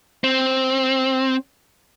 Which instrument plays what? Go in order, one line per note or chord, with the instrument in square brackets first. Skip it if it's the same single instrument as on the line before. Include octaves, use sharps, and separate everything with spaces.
[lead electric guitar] C4